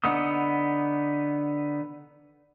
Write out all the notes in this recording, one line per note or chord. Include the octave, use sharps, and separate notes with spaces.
D3 B3 D#4 D#6